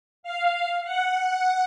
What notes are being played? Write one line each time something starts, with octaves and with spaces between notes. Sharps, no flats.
F5
F#5